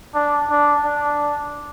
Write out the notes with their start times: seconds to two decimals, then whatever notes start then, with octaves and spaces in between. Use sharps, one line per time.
0.15 D4
0.50 D4
0.85 D4